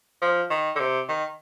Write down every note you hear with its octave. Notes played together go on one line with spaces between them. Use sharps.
F3
D#3
D3
C3
D#3